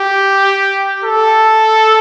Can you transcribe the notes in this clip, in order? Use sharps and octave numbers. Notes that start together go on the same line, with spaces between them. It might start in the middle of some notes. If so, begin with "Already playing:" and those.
Already playing: G4
A4